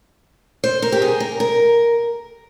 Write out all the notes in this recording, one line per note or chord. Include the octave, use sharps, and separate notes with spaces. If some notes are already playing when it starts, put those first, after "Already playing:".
C5
A#4
G4
G#4
A#4
A#4